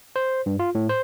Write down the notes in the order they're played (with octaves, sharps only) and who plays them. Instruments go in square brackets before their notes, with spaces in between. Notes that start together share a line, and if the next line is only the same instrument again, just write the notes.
[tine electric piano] C5
G2
F4
A2
C5